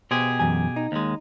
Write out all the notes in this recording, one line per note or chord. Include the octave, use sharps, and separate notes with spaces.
B2 G4 G#4 C5
F#2 E3 G#5
D#4
D#2 G#3